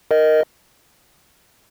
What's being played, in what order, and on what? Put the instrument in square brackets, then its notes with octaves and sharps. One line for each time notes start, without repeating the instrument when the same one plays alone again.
[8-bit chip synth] A#4 D#5